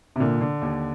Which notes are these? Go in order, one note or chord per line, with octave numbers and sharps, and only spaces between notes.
C3
A#2 D3
D3
D#2